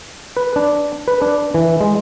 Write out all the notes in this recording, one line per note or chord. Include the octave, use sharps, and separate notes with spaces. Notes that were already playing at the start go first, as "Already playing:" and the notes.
B4
D4
B4
D4
E3
G#3